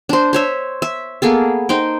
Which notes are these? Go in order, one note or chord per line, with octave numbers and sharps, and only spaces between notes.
D4 C5
C5 C#5 E5
E5
A#3 B3 G#4 A4
D#4 C5 G5